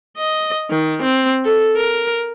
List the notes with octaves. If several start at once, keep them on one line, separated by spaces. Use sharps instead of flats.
D#5
D#3
C4
A4
A#4